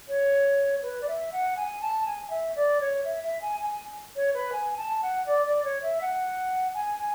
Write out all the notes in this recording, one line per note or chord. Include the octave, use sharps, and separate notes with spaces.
C#5
B4
D5
E5
F#5
G#5
A5
G#5
E5
D5
C#5
E5
E5
G#5
G#5
C#5
B4
G#5
A5
F#5
D5
D5
C#5
E5
F#5
G#5
G#5